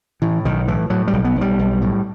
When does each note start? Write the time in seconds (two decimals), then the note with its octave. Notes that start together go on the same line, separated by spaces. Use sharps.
0.22 A2 E3
0.45 B1 D#3
0.67 A2 E3
0.90 A2 F#3
1.08 G3
1.13 B1
1.25 B3
1.36 B1
1.41 G3
1.59 B1
1.81 A2